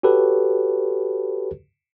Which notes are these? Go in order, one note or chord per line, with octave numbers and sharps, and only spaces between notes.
F#4 G4 A4 B4 C#5